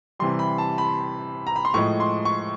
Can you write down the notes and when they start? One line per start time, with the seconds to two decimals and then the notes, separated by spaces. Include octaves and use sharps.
0.19 C3 E3 G3 C6
0.39 B5
0.58 A5
0.78 B5
1.47 A#5
1.56 B5
1.65 C6
1.74 A2 F3 G#3 C#6
2.00 C6
2.25 C#6